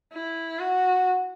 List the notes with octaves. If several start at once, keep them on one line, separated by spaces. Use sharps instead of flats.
E4
F#4